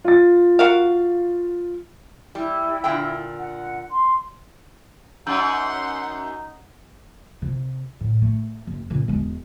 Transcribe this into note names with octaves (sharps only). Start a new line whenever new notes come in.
F4 A6
F#4 A#4 F5
G3 E4
A#2 D3 G5
F#5
C6
F#2 D#4 F#5 C6 E6 G6
C3
A2
A3
F#1
A#2 C#3
E1 G#3